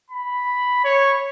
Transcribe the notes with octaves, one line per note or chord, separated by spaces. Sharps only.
B5
C#5